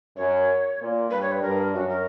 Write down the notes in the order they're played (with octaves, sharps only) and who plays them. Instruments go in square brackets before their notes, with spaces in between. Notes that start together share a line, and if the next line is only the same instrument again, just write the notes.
[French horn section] F#2 [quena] C#5
[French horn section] A#2
[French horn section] G2 [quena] B4
[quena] C#5
B4
[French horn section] G2 [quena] A#4
[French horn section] F#2 [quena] F#4
[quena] A#4